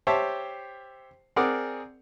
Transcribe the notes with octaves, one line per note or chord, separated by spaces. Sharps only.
G4 C5 C#5 E5 A5
C4 G#4 A#4 D5 F#5